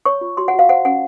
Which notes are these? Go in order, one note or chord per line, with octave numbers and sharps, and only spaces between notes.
C#5 C#6
F4
F#4 C6
F#5
F#4
F5
C5 F#5
C#4 F#5